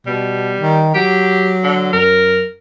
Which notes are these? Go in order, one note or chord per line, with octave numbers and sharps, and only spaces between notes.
B2 G3
D#3
F#3 G4
D3
F#2 A#4